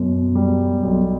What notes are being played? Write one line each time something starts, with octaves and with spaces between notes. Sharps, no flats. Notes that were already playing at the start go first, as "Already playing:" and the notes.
Already playing: F#2 B2
G3
B1